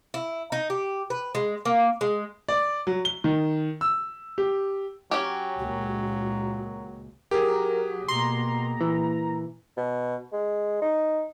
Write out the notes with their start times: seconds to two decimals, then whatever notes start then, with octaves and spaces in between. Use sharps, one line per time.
0.14 E4
0.52 D#4
0.70 G4
1.10 B4
1.35 G#3
1.65 A#3
2.01 G#3
2.48 D5
2.87 F#3
3.05 G7
3.24 D#3
3.81 E6
4.38 G4
5.11 F#3 C#4 G4
5.59 C#2 A#2 G#3 F#4
7.31 F#3 G4 G#4 A#4
8.08 B2 A#3 A#5 C6
8.81 A#2 E3 A#3
9.77 B2
10.33 G#3
10.82 D#4